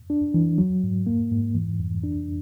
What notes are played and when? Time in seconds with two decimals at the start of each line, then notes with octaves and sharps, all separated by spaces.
0.10 D4
0.34 E3
0.58 F#3
0.84 G#2
1.07 A#3
1.32 G#2
1.55 E3
1.80 F2
2.04 D4